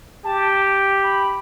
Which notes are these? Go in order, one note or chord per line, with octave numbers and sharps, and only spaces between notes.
G4 A5
B5